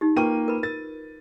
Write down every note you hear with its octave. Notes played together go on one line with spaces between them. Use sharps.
D#4 G4
A#3 F4 B4 G5 C#6 D#7
A#4 B4 B5
A#4 A6